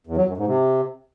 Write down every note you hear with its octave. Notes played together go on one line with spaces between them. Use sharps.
E2
F#3
F#2
G#2
C3